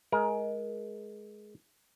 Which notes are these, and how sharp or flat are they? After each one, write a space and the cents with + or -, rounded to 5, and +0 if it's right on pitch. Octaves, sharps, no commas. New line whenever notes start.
G#3 +15 A#4 +25